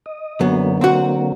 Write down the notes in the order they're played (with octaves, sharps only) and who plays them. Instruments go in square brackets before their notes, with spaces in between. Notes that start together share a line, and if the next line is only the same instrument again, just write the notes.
[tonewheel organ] D#5
[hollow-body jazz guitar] F#2 B3 [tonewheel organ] D3 F#3 A#3
[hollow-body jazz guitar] C4 F#4